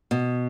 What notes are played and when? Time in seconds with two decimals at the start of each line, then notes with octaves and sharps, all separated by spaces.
0.11 B2